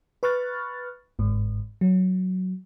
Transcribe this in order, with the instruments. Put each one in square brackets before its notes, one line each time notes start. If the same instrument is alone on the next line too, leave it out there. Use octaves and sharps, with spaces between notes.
[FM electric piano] B4 B5 C#6 F6 F#6 A6
G1 G#2
F#3